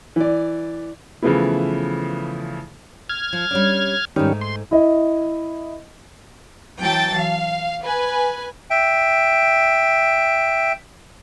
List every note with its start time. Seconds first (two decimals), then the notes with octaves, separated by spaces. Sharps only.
0.16 E3 D5
1.23 C#3 E3 F3 A3 B3 E4
3.09 F6 G#6
3.33 F3
3.51 G3 C#4 D4
4.16 G#2 D#3 G3 A3 C#4 D#4
4.41 C6
4.71 E4 D#5
6.80 E3 F#3 G5 A5 A6
7.15 F5
7.82 B4 G#5
8.70 E5 G5